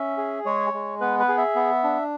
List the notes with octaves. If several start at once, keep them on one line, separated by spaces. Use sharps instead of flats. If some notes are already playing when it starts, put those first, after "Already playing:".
Already playing: C#4 E5
G#4
G#3 C#5
G#3
B3 B4
B4
G#4
E5
B3
D4